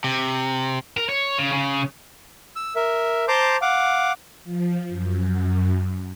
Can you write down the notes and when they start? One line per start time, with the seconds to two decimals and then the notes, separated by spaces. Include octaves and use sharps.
0.04 C3
0.97 A#4
1.09 C#5
1.38 C#3
1.52 C#3
2.56 E6
2.76 A#4 E5
3.28 C5 A5 A#5 C6 D6 G6
3.62 F5 F#5 D6
4.44 F3
4.89 F#2